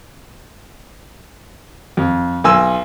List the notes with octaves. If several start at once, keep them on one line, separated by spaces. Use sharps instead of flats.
F2
B1 G#5 E6